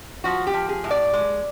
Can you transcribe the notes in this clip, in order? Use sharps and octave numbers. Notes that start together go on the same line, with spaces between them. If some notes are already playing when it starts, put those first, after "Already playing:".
F3 F#4
G4
F3
G#4
A2
D5
G#3